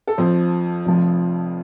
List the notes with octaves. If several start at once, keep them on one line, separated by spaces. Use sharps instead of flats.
A4
F2 F3 C5
F1 F2 F3